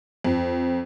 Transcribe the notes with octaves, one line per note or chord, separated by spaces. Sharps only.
F2